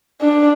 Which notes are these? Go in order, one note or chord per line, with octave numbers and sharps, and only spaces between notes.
D4